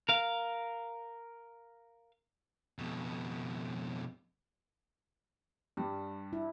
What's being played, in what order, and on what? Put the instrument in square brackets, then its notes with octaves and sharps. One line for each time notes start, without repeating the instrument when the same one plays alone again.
[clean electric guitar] A#4 F5
[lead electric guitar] F2 B2
[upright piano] G2 [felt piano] G3
[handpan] E4